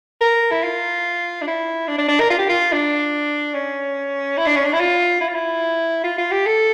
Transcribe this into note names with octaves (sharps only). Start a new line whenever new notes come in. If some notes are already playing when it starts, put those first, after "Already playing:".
A#4
E4
F4
D4
E4
D4
D4
D4
A#4
F4
G4
F4
D4
C#4
E4
D4
C#4
D4
E4
F4
E4
F4
E4
F4
F4
G4
A4